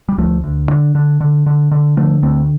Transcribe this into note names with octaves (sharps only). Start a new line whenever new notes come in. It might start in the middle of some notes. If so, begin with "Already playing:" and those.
G3
D2 F3 A3
D2
D3
D3
D3
D3
D3
D3 F3 A3
D2 A3 C4